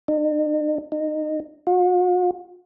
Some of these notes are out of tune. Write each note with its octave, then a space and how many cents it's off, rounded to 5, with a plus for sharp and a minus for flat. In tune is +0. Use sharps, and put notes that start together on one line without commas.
D#4 -45
D#4 -20
F#4 -45